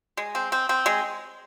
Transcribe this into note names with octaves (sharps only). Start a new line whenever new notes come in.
G#3
C4
C4
C4
G#3